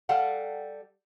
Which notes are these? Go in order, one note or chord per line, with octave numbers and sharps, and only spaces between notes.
G3 A4 F5 F#5